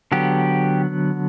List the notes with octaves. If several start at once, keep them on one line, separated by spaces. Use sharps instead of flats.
D3 F#3 B3 G4